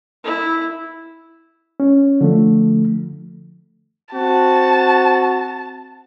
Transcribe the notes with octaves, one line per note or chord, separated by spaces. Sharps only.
E4
C#4
D3 F3 A3
C4 F#4 A5